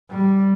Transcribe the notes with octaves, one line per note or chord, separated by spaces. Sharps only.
G3